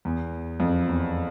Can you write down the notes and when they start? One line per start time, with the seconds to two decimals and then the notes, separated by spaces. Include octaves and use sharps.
0.05 E2
0.60 F2
0.88 E2